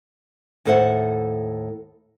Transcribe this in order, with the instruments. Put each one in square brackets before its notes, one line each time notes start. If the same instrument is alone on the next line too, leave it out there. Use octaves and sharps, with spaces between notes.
[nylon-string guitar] D#2 A2 A4 C5 E5 F#5